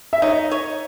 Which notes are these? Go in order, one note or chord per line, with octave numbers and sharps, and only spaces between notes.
E5
D#4 C#5
D#5
C#5